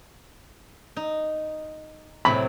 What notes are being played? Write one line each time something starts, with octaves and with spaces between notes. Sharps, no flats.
D#4
A2 C3 F#3 B5